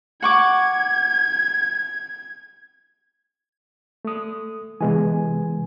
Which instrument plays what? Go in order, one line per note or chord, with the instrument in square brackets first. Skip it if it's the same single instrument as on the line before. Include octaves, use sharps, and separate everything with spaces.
[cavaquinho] F#5 C#6 D6 [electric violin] G#6
[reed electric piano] A3 D#6
[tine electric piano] C3 G#5 [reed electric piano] E3 G#3 B3